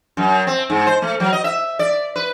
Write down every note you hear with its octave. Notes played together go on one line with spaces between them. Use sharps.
F#2
C4
G#2
C5
A3
F#3
D#5
E5
D5
B4